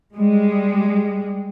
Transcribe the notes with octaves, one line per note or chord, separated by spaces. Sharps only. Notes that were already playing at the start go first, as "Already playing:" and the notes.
G3 G#3